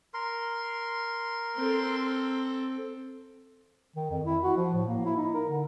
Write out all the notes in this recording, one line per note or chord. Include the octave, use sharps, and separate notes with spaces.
A#4 C6
C4 A4
D#3
F2
E4
F#4
F3
A2
A#3
E4
D#4
A#4
D3